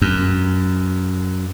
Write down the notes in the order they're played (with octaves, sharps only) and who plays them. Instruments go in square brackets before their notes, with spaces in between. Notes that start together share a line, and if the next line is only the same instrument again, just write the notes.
[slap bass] F#2